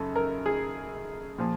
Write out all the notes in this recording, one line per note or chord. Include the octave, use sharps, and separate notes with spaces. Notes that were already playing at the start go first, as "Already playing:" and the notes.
Already playing: F#2 C#3 A4
A#4
G#4
A#2 F3